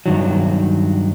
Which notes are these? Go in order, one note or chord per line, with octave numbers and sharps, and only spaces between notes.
G2 D#3 F#3